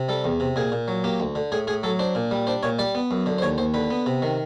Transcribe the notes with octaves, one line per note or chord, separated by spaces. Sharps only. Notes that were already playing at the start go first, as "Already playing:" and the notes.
Already playing: C3
G3 A4
E2
C3
A#2 G#4
A#2
F#3
A#3 G4
D2
D3
A2 G#4
A2 G#4
F#3 A4
D4 C5
A#2
G3
D4 C5
A#2 C#5
G3 D5
B3
F#2
D3
C5
D#2 C#5
D#2 C5
D3 B4
B3
C3
D#3